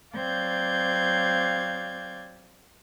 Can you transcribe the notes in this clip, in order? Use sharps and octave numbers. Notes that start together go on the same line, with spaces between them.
F#3 C4 D5 F5 G6 G#6